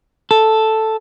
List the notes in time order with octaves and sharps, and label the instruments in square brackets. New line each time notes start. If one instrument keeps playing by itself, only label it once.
[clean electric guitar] A4